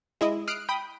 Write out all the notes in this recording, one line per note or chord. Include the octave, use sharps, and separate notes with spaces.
G#3 E4 D#5
D#6 F6 F#6 C7 D7
G5 B5 D#6